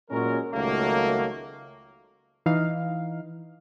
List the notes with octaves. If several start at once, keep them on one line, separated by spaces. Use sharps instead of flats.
A#2 F#3 G#3 C#4 A#4
C#2 D#3 F#3 A3 A#3
E3 D#4 F5